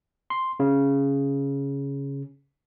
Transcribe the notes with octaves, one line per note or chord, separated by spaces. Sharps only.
C6
C#3